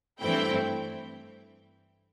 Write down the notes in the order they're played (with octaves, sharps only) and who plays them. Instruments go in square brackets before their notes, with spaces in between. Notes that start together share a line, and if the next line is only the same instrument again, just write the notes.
[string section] G2 E3 A3 C4 E4 G5